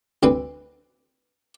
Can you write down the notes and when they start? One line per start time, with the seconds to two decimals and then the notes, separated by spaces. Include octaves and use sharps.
0.23 D2 D3 C4 B4